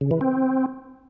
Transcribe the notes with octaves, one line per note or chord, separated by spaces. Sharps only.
C#3
E3
C4